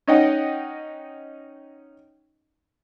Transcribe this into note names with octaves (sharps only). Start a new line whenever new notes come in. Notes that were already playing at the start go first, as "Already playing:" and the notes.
C#4 D#4 D#5 F#5 G5